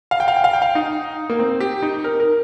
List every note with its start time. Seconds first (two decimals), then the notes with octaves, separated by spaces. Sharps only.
0.11 F5
0.20 G5
0.28 F5
0.36 G5
0.44 F5
0.53 G5
0.62 F5
0.75 D#4
1.30 A#3
1.39 C4
1.61 G4
1.82 D#4
2.04 A#4
2.20 A#4